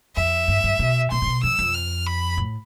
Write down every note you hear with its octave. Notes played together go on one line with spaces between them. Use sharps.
F2 E5
G2
G2
B2
B2 C6
A2
B2
F2 E6
F2
F6
B5
A2